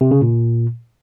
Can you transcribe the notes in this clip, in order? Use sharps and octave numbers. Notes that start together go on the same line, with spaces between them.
C3
C#3
A#2